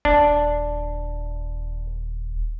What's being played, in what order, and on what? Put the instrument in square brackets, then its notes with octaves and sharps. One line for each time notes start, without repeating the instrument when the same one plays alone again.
[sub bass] D#1 [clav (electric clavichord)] D4